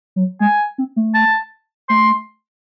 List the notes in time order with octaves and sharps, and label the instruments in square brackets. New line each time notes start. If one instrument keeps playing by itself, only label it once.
[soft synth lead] F#3
[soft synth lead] G#3 [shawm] G#5
[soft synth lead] C4
A3
[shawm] A5
[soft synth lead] A3 [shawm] C6